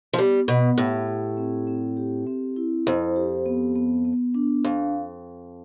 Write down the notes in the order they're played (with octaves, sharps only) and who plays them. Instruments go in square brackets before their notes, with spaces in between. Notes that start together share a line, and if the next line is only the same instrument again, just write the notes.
[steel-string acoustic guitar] F3
[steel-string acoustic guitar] G3 [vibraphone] B3
[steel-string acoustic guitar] B2 [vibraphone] B3
[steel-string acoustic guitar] A2 [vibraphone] G4
[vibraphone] G4
C4
C4
G4
C4
E4
[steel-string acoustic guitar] F2 [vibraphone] C5
[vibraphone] G4
B3
B3
B3
D4
[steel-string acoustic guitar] F2 [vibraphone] F5